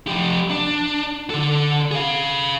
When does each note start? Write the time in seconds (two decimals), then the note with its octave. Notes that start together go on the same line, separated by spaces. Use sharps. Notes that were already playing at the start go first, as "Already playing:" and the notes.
0.08 F3 G4
0.50 D4
1.30 D3 A4
1.91 G#4 F5